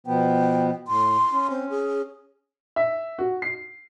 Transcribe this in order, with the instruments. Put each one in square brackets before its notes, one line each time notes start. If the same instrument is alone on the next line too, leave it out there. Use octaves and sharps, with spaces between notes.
[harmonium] B2 F3 B3 [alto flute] G5
[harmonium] A2 [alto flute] C6
[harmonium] C#4
[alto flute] C4
G#4
[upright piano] E5
F#4
C7